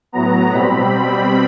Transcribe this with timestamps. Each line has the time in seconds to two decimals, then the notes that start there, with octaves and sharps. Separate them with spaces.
0.12 A2 F#3 B3 A#5
0.51 B2 G3 C4 B5